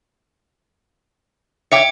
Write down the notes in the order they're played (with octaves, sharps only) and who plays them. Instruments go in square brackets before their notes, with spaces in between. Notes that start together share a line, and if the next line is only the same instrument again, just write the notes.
[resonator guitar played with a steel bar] C#5 E5 G5 [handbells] D6 C#7